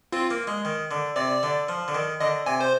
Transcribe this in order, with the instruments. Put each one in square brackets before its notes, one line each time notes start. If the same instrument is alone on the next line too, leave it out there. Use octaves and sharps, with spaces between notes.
[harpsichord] C4 [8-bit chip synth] F4
[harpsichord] A#3
G#3
D#3
D3
[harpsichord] C3 [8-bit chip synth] D5
[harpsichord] D3
F3
D3
D#3
[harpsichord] D3 [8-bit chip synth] D#5
[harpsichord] C3 [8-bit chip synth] G#5
[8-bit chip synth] C5